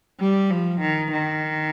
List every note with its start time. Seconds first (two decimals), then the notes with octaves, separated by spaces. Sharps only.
0.20 G3
0.50 F3
0.81 D#3
1.12 D#3